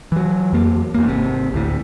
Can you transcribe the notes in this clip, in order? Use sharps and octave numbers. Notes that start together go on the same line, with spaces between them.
E3 F#3
F2 A#3
E2 A#3
G#1 C3
D2 A2